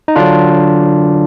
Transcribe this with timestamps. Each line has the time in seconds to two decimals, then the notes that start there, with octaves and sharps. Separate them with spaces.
0.08 D#4
0.16 D3 F#3 D4 F4